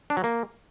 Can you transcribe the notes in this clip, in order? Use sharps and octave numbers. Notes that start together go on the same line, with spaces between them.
D4
F#3
A#3